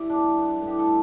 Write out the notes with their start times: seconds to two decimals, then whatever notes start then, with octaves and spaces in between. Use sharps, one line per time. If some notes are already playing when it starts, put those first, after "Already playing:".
Already playing: G2 E4 G4
0.10 D4
0.15 B3
0.27 G2
0.38 B3
0.61 A2
0.67 G4
0.79 A4